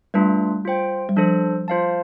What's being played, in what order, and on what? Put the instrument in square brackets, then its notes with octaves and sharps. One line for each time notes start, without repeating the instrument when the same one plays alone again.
[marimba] G3 [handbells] A3 D4 F4 B4
[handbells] F4 C5 G5
[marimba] G3
[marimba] F3 [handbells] D4 A4 C5
[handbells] F4 C5 F5 A5